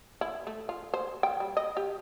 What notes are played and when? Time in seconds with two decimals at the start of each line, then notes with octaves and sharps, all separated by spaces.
0.21 E4
0.47 A3
0.69 F4
0.94 C5
1.23 G5
1.40 G3
1.57 D#5
1.77 G4